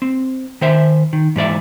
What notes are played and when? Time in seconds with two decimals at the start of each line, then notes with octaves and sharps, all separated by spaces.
0.02 C4
0.61 D#3 C5 E5
1.13 D#3
1.36 G#2 E3 D5 E5